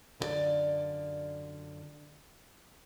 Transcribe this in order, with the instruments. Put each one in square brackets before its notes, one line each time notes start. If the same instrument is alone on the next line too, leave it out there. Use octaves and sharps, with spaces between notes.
[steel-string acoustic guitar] F#2 D3 E4 F4 D5